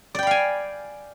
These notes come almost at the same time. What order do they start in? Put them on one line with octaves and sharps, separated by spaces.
D5 G5 B5 F5 G#5